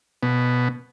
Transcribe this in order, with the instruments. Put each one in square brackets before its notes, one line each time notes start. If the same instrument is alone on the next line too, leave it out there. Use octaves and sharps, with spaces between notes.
[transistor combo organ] B2